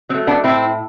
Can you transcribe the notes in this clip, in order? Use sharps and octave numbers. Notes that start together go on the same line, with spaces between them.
F#3 A3 C4
B3 D4
A2 C4 E4